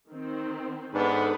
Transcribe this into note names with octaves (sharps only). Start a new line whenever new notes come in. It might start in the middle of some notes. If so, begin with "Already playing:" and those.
D#3 C4
G#2 B3 D4 A4 B4